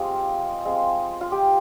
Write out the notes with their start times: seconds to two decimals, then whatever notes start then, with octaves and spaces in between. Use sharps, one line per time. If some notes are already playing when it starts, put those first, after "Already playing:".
Already playing: F3 G#3 C4 F4 G4
0.65 G#3 C4 F4
1.21 F4
1.32 G4